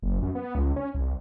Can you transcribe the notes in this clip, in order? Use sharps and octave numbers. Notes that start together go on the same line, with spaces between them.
F#1
F#2
B3
C#2
C#4
C2